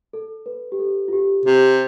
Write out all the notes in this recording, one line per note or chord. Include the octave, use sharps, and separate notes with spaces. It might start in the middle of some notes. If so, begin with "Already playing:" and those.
A4
B4
G4
A4
F4
G4
C3 G4